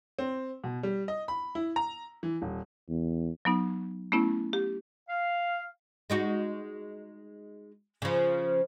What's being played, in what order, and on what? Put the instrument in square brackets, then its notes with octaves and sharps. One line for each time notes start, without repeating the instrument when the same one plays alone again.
[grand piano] C4
B2
G3
D#5
B5
E4
A#5
E3
D#1
[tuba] E2
[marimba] F#3 B3 D#4
A3 B3 C#4 E4
G4
[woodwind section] F5
[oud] G#3 D#4 F#4
C#3 F3